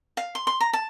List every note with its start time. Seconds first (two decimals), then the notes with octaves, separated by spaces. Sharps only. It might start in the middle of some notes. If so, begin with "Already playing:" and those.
0.17 F5
0.35 C6
0.47 C6
0.61 A#5
0.73 A5